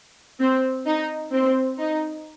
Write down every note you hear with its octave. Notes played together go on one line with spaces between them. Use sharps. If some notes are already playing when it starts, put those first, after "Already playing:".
C4
D#4
C4
D#4